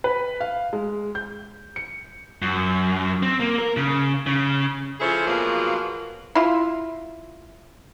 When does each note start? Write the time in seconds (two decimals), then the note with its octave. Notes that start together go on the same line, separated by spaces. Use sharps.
0.04 B4
0.40 F5
0.73 G#3
1.15 G6
1.76 C#7
2.42 F#2
3.23 C4
3.40 A#3
3.59 A#4
3.77 C#3
4.27 C#3
5.00 F3 C#4 E4 G#4 A4 C5
5.27 B2 F3 F#3 A#3 F4 G#4
6.35 E4 F4